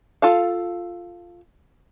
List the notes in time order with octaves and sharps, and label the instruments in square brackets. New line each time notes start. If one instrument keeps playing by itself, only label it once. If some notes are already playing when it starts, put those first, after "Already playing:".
[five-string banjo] F4 A4 F5